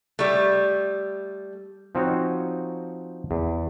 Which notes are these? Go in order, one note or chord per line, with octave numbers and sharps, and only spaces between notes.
G3 A3
F3 C4 D#4 F#4 C#5
E2